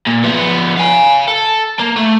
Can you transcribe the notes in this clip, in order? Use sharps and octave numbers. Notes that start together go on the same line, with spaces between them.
A#2
F3 B3
F5 G#5
A4
A#3
A3